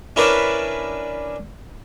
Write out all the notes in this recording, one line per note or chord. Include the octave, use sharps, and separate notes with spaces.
C#4 D4 E4 A#4 B4 D5